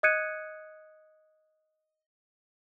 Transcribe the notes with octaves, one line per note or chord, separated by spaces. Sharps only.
D#5 D#6 F#6 G#6 C#7 D#7